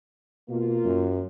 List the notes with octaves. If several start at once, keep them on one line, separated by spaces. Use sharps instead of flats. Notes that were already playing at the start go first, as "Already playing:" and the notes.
B2 A#3 F4
F#2